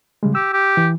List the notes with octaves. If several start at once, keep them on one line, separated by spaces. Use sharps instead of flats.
C#3 G3 G#3
G4 E6
G4
E3